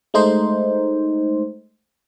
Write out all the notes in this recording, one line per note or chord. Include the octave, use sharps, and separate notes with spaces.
G#3 A3 D#4 C5